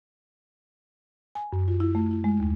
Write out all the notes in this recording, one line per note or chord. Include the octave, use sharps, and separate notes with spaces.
G#5
F#2
F4
E4
A3
E4
G#3
D#2